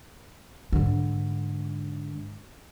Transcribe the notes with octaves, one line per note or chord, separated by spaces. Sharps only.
G#2 D3